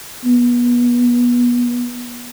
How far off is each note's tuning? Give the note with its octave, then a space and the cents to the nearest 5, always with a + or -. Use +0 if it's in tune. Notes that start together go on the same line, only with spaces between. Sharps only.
B3 -30